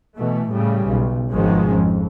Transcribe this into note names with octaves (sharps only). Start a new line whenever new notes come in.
B2 E3 A3
A2 C#3 G3
B1
G#1 B2 D#3 F3 G#3 C#4
F2